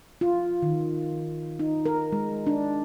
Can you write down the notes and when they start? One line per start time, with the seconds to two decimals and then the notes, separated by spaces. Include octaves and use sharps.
0.21 F4
0.62 D#3
1.59 D#4
1.86 A#4
2.12 G#3
2.46 D4